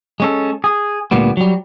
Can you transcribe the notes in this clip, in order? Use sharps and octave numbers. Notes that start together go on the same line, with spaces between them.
G#3 C#4 A4
G#4
D2 A#2 G3 B3
F#3 G3